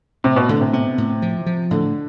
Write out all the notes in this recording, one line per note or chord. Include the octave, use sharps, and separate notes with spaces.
A2 C3
B2
A2 D3
C3
C3 B3
A2
F3
F3
A2 D3